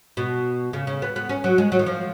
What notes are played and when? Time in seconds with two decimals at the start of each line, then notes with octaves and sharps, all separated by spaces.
0.17 B2
0.73 C#3
0.87 C#3
1.02 B3
1.16 B3
1.29 C#4
1.44 F#3
1.58 G#3
1.72 F#3
1.79 D#3
1.86 F3